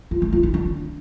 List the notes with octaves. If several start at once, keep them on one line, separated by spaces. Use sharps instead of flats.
F4
A3
F4
E4
D4